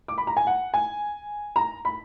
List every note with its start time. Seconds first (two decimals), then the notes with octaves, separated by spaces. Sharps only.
0.08 D6
0.18 B5
0.27 A#5
0.37 G#5
0.47 F#5
0.74 G#5
1.56 A#5
1.85 B5